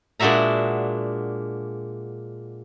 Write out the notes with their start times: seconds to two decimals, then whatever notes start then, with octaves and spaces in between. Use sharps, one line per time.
0.20 A#2 G#3 D4 F#4 E5 A#5